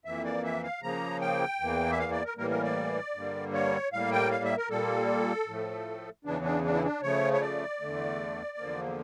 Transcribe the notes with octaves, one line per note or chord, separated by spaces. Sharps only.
F2 E3 A#3 E5
D5
E5
F5
C#3 F3 A#3 A#5
G5
E2 E3 A#3
E5
F5
D5
A#4
A2 E3 G3 A#3 A#4
A#4
D5
G2 D3 G3 A#3
C#5
A2 G3 A#3 F5
G5
F5
E5
A#4
A#2 G3 A#3 A4
A2 F3 A3
E2 C#3 E3 D4
D4
D4
E4
D4
C#3 F3 A3 C#5
C#5
D5
E2 D3 A3
E2 D3 F3 A#3